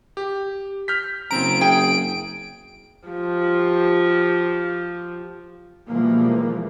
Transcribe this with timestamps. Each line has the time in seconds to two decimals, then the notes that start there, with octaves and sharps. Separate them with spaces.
0.17 G4
0.88 F6 G6 B6
1.31 F#1 C#3 C4 A#5 D7
1.61 G#4 G5
3.08 F3 G4
5.88 B2 E3 F3 G3 G#3 A#3